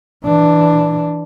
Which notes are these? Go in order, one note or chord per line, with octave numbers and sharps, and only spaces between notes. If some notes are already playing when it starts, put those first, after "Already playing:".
E3 D4